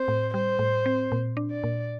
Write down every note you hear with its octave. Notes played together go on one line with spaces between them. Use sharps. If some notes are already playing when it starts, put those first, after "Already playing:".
Already playing: C4 C5
A2
G3 C5
A2
C4
A#2
D4
D5
A#2